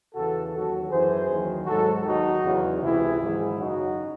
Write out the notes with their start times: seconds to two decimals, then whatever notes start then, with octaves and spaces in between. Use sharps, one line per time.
0.14 E2 C#3 E3 F#4 A4
0.52 D#2 D#3 F#3 F#4 A4
0.90 F#2 E3 G#4 C5
1.28 D#2 D#3 F#3
1.66 G#2 F#3 F#4 A4
2.04 D#2 D#3 F#3 D#4 F#4
2.42 E2 C#3 F#3
2.80 C#2 C3 E3 E4 G#4
3.18 G#2 D#3 F#3
3.56 F#2 C#3 F#3 D#4 F#4